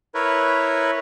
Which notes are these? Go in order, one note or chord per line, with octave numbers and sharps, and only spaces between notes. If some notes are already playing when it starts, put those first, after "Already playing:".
E4 A#4 B4 C#5